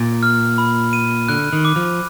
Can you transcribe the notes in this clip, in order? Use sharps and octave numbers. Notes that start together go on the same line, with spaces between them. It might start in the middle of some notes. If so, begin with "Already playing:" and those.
Already playing: A#2
F6
B5
D#7
D3 F#6
D#3
D6
F3